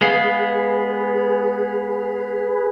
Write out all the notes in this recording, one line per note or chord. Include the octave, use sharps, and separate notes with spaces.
G#3 B3 G#4 B4 F5